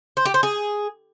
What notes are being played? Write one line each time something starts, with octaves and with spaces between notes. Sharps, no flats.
C5
G4
C5
G#4